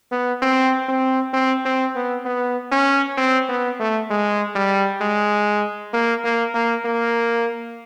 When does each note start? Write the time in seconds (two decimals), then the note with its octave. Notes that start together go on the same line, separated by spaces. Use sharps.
0.12 B3
0.42 C4
0.89 C4
1.34 C4
1.65 C4
1.96 B3
2.26 B3
2.72 C#4
3.18 C4
3.49 B3
3.80 A3
4.11 G#3
4.56 G3
5.01 G#3
5.94 A#3
6.25 A#3
6.55 A#3
6.85 A#3